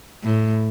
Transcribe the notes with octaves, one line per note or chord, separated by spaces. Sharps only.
A2